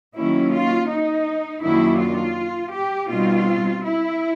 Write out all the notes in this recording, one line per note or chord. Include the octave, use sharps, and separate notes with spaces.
D#3 F#3 A#3 C#4 E4
F4
D#4
F#2 D#3 F#3 A#3 D4 E4
F4
G4
B2 G3 C4 D#4 F4
E4